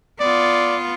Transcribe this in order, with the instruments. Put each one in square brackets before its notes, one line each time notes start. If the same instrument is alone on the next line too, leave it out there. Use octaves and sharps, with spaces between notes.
[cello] B3 F4 [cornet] D5